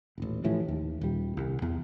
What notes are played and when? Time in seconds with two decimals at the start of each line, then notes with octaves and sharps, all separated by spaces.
0.18 D#1 A1
0.44 A1 A2 E3 F3
0.68 D#2
1.01 D#1 G3
1.37 C2
1.62 E2